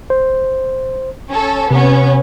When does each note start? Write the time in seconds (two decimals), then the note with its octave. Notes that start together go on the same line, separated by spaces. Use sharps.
0.10 C5
1.30 C#4 A4
1.71 C3 B3 C#4